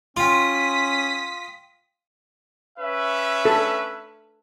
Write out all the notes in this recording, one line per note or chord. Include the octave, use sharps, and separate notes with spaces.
C#4 F4 G5 C6 D#6 B6
C#4 B4 E5
A4